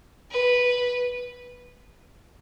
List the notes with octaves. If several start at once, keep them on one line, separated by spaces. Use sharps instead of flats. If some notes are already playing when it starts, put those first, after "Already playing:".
B4